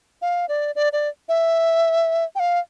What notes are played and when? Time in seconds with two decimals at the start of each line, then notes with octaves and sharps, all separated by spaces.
0.22 F5
0.49 D5
0.75 D5
0.93 D5
1.29 E5
2.35 G5
2.40 F5